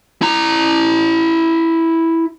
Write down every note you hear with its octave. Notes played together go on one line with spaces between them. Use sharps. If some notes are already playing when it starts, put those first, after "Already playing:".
E4 A#5